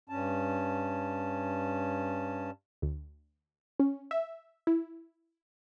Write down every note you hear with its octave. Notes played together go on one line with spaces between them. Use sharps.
G2 C#4 A5
D2
C#4
E5
E4